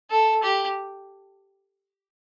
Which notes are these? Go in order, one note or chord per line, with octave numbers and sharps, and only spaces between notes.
A4
G4